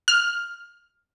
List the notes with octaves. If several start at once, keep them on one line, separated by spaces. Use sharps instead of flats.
F6